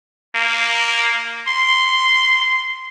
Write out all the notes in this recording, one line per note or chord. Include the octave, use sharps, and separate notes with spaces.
A#3
C6